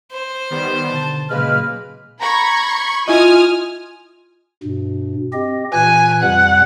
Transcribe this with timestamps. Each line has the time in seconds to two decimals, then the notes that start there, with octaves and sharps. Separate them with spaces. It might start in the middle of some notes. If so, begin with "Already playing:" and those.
0.13 C5
0.50 D#3 G3 B3
0.88 B2 D3 A5
1.30 A#2 C#3 F#3 G#3 A#3 B4 F6
2.20 A#5 B5 C#6 G#6
3.08 E4 F4 D#5 G#5 D#6 F6
4.63 G2 B2
5.33 C4 G4 D#5
5.74 A#2 E3 G#5 F#6
6.23 F2 C3 G3 F#5